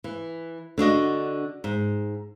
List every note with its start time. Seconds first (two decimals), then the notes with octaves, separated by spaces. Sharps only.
0.04 E3
0.78 D3 D4 F#4 D#5
1.64 G#2